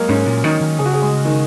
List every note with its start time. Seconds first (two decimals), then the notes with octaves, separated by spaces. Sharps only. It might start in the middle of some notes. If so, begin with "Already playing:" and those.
Already playing: F#3 G#3 A#3
0.09 G#2 C#4
0.26 A#2
0.44 D#3 D#4
0.61 D#3
0.79 C#3 G#4
0.86 F#4
0.93 G#4
1.02 G#3
1.25 D#3